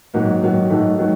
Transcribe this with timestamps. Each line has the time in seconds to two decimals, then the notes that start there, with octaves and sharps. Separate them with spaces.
0.14 G#2 D#3 F#3 A#3
0.42 G#2 D#3 F#3
0.69 G#2 D#3 F#3 A3
0.99 D#3 F#3